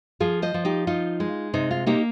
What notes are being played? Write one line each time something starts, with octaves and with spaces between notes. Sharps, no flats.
F3 F4 G#4
C5 D#5
F3
D#4 G4
D#4 F4
G#3
C3 D#4
F4
A#3 D#4 G4